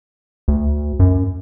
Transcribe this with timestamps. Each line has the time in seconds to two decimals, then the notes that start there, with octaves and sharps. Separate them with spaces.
0.48 D2
1.00 F#2